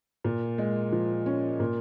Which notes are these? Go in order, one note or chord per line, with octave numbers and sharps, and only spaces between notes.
A#2
G#3
F3
C#4
A#2